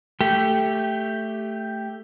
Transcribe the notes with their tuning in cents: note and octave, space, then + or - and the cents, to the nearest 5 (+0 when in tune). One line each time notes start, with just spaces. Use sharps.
A3 +5 G4 +0